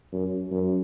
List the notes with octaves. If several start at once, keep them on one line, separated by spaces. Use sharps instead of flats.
F#2
F#2